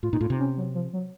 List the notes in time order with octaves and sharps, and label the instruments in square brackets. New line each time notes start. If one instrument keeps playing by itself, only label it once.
[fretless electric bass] A2 [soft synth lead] F4
[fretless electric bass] A#2 [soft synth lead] D#4
[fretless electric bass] A2 [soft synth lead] F4
[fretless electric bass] C3
[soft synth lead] C#4
F#3
F3
F#3